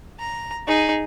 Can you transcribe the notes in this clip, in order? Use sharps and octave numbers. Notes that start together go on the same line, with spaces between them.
A#5
D#4 G#4